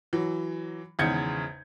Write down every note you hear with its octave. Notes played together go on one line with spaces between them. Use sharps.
E3 F#3
G#1 E2 C#3 G6 G#6 C#7